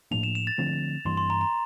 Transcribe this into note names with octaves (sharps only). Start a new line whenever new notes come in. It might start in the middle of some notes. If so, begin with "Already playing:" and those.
A2 F3 A#3 D4 F7
E7
E7
A6
D3 F3 A3 C4
G2 E3 A#3 C6
C6
A#5
A#5